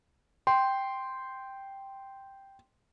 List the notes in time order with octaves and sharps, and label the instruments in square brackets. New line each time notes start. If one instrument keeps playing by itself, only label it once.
[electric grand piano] G5 C6